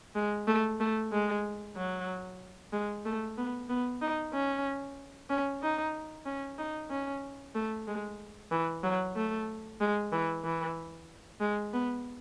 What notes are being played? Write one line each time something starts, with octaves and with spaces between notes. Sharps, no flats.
G#3
A3
A3
G#3
F#3
G#3
A3
B3
B3
D#4
C#4
C#4
D#4
C#4
D#4
C#4
A3
G#3
E3
F#3
A3
G#3
E3
E3
G#3
B3